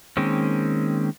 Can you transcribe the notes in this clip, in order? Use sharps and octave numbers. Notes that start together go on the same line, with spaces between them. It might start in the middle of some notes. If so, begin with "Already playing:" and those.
D#3 G#3 A#3 C4 C#4